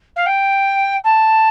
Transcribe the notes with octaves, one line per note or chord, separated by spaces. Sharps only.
F5
G5
A5